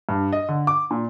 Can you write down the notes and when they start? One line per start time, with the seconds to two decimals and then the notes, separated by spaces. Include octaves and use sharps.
0.09 G2
0.33 D#5
0.49 D3
0.67 D6
0.91 A#2